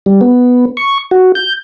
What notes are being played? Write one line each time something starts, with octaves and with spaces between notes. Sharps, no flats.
G3
B3
C#6
F#4
G6